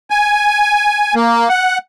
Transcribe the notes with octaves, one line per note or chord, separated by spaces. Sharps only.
G#5
A#3
F#5